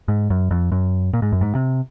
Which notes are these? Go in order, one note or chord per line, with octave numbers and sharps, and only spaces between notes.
G#2
F#2
F2
F#2
A#2
G#2
F#2
G#2
C3